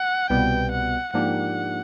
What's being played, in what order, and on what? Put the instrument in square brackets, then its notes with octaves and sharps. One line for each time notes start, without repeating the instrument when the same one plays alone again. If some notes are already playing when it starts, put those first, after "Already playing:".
Already playing: [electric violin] F#5
[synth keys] C2 B2 G3 B3 [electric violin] G5
[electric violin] F#5
[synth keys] G#2 F3 A#3 D4 G4 [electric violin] F#5